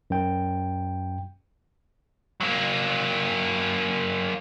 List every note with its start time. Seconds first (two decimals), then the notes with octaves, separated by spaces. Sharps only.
0.10 F#2 G5
2.41 F#3 A#3